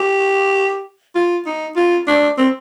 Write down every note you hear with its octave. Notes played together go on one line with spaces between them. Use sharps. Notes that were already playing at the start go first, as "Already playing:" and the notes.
Already playing: G4
F4
D#4
F4
D4
C4